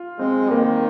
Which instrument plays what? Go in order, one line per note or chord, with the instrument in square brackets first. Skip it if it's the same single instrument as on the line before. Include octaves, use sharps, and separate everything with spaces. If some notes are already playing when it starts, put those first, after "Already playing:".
Already playing: [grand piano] F4
[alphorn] G#3 [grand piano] C4
[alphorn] D#3 [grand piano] A#3